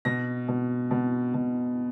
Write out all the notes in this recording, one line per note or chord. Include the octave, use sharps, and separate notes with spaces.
B2 A#6
B2
B2
B2